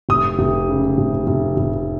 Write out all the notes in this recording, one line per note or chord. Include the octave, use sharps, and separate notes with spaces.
F1 D#6
F1
C#3
F1
F1
F1